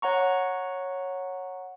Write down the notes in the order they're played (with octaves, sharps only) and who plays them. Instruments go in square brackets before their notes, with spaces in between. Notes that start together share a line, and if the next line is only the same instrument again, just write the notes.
[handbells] C#5 F#5 A#5 C#6